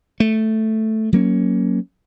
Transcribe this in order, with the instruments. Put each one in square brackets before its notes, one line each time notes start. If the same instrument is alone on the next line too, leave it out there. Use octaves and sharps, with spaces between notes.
[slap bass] A3
F#3 A#3 C#4